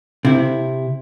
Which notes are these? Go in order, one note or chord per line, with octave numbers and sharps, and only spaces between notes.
C3 E4